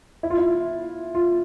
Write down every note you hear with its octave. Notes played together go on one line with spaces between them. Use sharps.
E4
F4
E4
F4